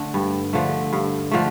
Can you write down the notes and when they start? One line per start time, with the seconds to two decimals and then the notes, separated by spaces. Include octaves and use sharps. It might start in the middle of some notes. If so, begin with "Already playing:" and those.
Already playing: D3 A3
0.14 G2
0.53 D3 F3 A3
0.93 G2
1.31 D3 F3 A3